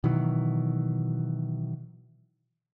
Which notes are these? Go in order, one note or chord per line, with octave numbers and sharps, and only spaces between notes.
B2 D#3 E3 F#3